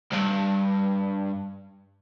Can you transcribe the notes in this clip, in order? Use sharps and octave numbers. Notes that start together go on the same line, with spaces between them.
C2 G2